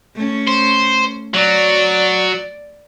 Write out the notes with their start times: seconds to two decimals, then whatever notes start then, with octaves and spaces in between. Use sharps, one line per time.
0.15 A3 C#4
0.48 C5
1.34 F#3 D5